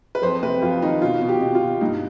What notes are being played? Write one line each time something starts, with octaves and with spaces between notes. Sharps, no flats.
B4
F2 C5
C3 B4
F2 F4
D#3 D#4
B2 F4
B2
G4
B2
F4
B2
G2 D#4